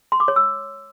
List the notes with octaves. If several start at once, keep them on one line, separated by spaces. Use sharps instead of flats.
C6
D6
C#5
E6